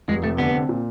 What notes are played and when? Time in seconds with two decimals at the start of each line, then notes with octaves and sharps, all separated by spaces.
0.08 F1 G#3
0.24 C3 A3
0.38 D3 B3
0.54 C4
0.69 A#2